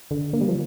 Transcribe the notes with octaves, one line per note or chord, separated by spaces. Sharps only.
D3
A#3
G3
F3